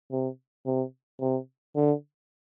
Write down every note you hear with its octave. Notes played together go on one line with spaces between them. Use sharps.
C3
C3
C3
D3